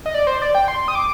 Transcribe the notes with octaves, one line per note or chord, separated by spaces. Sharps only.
D#5
D5
C5
D5
G5
C6
D#6
D6